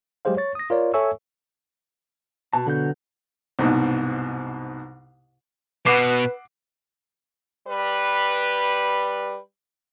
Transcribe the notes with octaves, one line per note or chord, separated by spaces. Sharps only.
F#3 G#3 G4 G#4 C5 F5
C#5 C#6 A6
D#6 A#6
F4 A#4 C#5 D5
A4 C#5 E5 G#5 C#6 E6
B2 A5
D3 F#3 F#5 G6
C2 G#2 B2
B2 B4 F#5 D6 C7
G3 B4